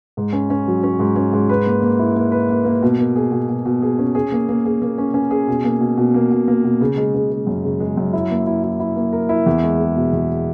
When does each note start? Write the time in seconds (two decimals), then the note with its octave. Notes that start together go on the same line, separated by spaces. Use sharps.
0.17 G#2
0.33 C#4
0.50 C#4
0.67 F#3
0.83 C#4
0.99 G#2
1.16 C#4
1.33 G#2
1.49 B4
1.67 A#3
1.82 A#3
1.99 E4
2.16 A#3
2.32 B4
2.49 A#3
2.65 A#3
2.82 B2
2.99 A#3
3.16 G#4
3.32 B2
3.49 B2
3.65 B2
3.82 G#4
3.99 C#4
4.15 G#4
4.32 A#3
4.49 A#3
4.65 G#4
4.82 A#3
4.98 C#4
5.14 C#4
5.31 G#4
5.48 B2
5.64 A#3
5.80 B2
5.97 B2
6.14 A#3
6.31 B2
6.48 A#3
6.64 B2
6.81 C#3
6.97 G#3
7.14 C#3
7.31 G#3
7.47 F#2
7.64 C#3
7.80 G#3
7.97 F#2
8.13 E4
8.31 A#3
8.47 E4
8.64 E4
8.80 E4
8.96 A#3
9.13 A#4
9.29 E4
9.46 E2
9.63 G#3
9.79 G#3
9.96 B2
10.13 E2